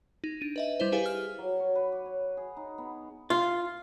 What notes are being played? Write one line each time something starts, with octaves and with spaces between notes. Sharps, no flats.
D#4
D4 D#7
B4 D#5 E5
G3 E4 C5
E4 G4 G#4 B4 F5 G#5
F6
F#3
C#5
B4
D6
C#5
G#4
D#4
B3
F4